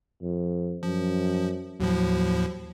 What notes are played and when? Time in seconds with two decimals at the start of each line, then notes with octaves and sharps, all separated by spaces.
0.22 F2
0.83 F#2 F3
1.80 D#2 A2 F3 F#3